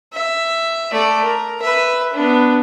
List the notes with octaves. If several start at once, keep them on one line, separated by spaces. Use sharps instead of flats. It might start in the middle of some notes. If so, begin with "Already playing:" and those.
E5
A3 D5
A#4
B4 E5
B3 D4